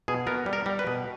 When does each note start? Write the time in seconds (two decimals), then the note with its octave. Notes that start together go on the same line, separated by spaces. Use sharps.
0.08 B2 G#4
0.27 B3 A#4
0.46 G3
0.53 A#4
0.66 G3
0.79 B4
0.87 B2